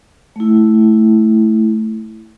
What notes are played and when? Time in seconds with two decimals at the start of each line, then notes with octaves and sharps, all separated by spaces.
0.36 A3 E4